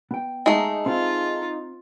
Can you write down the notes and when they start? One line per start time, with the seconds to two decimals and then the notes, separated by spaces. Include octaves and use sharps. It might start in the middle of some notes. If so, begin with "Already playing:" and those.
0.11 B3 G5
0.46 G#3 A3 D#4
0.86 C4 F4